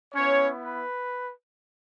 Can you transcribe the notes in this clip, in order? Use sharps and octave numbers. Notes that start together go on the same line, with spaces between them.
B3 C#4 E4 C#5
B4